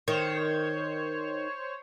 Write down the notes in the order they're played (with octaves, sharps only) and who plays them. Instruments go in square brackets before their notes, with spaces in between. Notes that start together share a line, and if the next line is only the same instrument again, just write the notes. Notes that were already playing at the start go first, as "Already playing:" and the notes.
[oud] D#3 [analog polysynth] C5 C#5